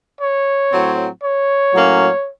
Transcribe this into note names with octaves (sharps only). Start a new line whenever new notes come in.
C#5
A2 F#3 C4
C#5
A2 F#3 A#3 C#4